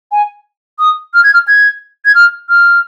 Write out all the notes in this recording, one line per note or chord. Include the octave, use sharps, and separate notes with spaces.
G#5
D#6
F6
G#6
F6
G#6
G#6
F6
F6